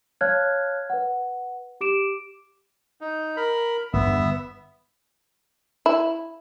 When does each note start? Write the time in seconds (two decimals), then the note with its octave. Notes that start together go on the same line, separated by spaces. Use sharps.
0.21 C#5 F5 A5 F6 F#6 G#6
0.90 B4 F#5
1.81 G4 D6 D7 E7
3.01 D#4
3.37 A#4 B5
3.93 G1 E2 G2 B3 E5
5.86 E4